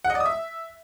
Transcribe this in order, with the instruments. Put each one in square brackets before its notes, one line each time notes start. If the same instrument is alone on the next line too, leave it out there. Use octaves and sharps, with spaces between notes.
[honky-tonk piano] F#5
D#5
D5
D#6
E5